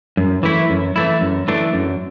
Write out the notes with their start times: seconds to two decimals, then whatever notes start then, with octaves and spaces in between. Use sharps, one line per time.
0.17 F#2
0.43 E3 A3 E4
0.70 F#2
0.96 E3 A3 E4
1.21 F#2
1.48 E3 A3 D4
1.74 F#2